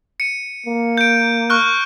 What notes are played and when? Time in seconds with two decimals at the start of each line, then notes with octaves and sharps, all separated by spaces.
0.20 C#7 D#7
0.66 A#3
0.98 G6 D7
1.50 C#6 F6 F#6